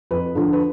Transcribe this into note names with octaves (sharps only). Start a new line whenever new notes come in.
F2 B4
D3 F3
B4